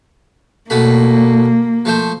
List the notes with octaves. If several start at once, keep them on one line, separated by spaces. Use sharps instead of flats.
B2 A3 A#3 B5
F3 A3 C5